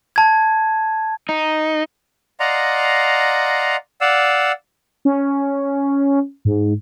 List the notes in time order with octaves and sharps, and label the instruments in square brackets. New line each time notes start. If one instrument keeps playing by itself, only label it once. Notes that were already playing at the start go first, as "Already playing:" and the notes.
[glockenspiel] A5 G#6
[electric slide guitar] D#4
[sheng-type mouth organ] D5 D#5 F5 F#5 A#5 C6
D5 F5 F#5 E6
[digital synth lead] C#4
G#2